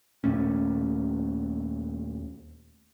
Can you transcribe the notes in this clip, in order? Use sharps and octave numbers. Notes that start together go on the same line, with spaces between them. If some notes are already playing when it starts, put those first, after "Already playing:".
D#2 A#2 A3 C#4